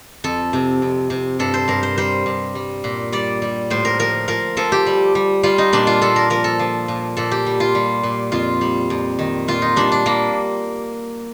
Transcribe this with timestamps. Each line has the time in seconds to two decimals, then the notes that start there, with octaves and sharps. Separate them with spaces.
0.24 F2 A4
0.53 C3
0.82 F2
1.10 C3
1.39 G2 A4
1.54 C5
1.68 G2 A#4
1.83 C5
1.98 G3 C5
2.26 G2
2.55 G3
2.84 A#2
3.12 G3 D5
3.42 G3
3.70 A2 C5
3.85 A#4
3.99 F3 A#4
4.28 F3 A#4
4.57 F3 A4
4.72 G4
4.86 G3
5.15 G3
5.43 G3 F4
5.58 D#4
5.73 A#2 D4
5.87 F4
6.01 A#2 A4
6.16 A#4
6.30 F3 A#4
6.44 A4
6.59 F3
6.88 A#2
7.17 A#2 A4
7.31 G4
7.46 G3
7.60 F4
7.75 G3
8.03 A#2
8.32 F2 F4
8.61 G3
8.90 F2
9.19 D#3
9.48 A#2 F4
9.62 D#4
9.76 G3 D4
9.92 D4
10.06 G3 A#3